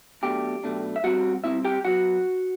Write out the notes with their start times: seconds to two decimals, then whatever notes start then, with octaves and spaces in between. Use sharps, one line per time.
0.22 B1 B2 A3 D4 G4 G5
0.64 B1 B2 A3 D4
0.96 E5
1.03 B2 G3 C4 F#4 F#5
1.44 B2 G3 C4 E4 E5
1.65 G4 G5
1.85 F#2 F#3 B3 F#4 F#5